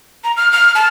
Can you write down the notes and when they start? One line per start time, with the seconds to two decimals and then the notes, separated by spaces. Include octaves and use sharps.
0.24 A#5
0.37 F6
0.52 F6
0.75 A5